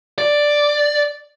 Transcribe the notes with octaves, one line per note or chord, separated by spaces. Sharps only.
D5